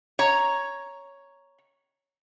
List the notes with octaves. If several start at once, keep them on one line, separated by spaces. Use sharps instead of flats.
C#5 A#5